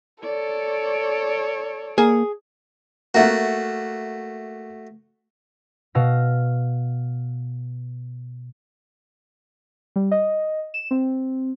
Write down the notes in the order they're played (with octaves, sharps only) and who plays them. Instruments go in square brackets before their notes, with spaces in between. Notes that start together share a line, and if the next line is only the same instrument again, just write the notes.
[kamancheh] A4 C#5 [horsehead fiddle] D5
[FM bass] A#3 [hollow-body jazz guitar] G#4
[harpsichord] A3 F#4 [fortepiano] A#3 E5 F#5
[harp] B2 F5 E6 A#6
[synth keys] G3
D#5
E7
C4